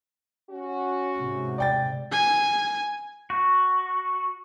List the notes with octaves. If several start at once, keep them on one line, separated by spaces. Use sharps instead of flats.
C#4 F#4
G#2 C3
D5 G5 A6
G#5
F#4